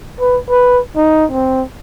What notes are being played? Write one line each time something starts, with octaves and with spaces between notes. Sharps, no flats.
B4
B4
D#4
C4